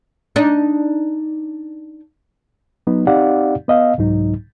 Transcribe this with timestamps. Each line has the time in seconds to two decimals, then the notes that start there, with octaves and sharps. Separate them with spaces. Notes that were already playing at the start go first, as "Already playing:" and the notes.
0.36 D4 D#4
2.87 F#3 B3 D#4
3.07 C4 D#4 G4 D5 F5 F#5
3.68 B3 D#5 F5
3.98 C2 G#2 F#3 D#4